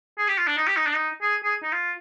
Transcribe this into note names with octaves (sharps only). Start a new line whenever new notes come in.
G#4
G4
F4
D4
D#4
G4
D#4
D4
D#4
G#4
G#4
D#4
F4